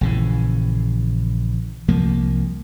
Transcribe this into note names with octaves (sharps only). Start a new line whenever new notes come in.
A#1 C#3 E3
C2 F3 A#3